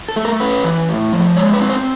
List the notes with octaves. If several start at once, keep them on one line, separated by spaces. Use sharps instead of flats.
A4
A3
A#4
C#4 B4
E3
A2
F3
G#3 C#5
B4
C4
C5